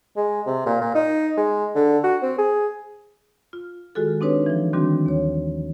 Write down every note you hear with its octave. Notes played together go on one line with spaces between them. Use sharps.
G#3
C3
A#2
A#2
D#4
G#3
D3
F#4
C4
G#4
F4
D#3 G#3 F4 F#4 G#4 A4
C4 D4 D#4 G4 B4 C#5
E3 F3
D3 D#3 G3 C4 D4 F#4
D#2 C#5